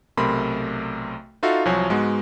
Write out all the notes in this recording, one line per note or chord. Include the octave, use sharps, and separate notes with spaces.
B1 C3 A3 A#4 B5 C6
D#4 F4 F#4 A4 E5 F5
C2 F3 F#3 F#4 C#5 G#5
G#2 G#3 B3 F#4